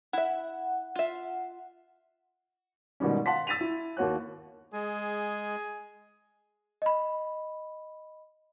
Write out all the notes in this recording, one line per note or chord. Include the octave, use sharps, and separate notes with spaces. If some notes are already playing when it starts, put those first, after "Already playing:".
E4 E5 F#5
F4 E5
G#2 B2 D#3 G3 C#4
F5 F#5 A5 C6 B6
E6 A6 B6 D#7 F7
E4
D#2 A#3 F#4 C#5 F#6
G#3 G#4
D#5 B5